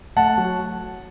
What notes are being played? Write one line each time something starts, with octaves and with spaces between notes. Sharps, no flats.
A3 F#5 A5
F#3